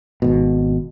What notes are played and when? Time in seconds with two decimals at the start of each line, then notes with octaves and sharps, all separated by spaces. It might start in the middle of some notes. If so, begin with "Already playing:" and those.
0.22 G#1 B2